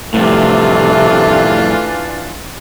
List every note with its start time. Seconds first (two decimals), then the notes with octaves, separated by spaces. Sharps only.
0.14 F2 A2 C3 E3 A3 D4 F4